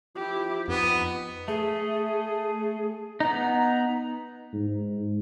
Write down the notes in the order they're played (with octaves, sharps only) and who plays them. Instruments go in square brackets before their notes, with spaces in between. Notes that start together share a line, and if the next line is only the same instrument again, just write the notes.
[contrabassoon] F3 [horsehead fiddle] E4 G4
[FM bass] F2 [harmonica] B3 [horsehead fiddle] D#4
[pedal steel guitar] A3 [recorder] G#4
[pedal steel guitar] B3 D#4 [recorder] A#5
[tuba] G#2